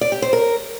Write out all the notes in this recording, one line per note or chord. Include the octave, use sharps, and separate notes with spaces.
D5
G4
C5
A#4